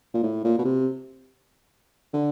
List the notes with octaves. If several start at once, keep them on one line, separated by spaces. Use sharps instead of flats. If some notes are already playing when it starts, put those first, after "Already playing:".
A#2
A2
A#2
B2
C3
D3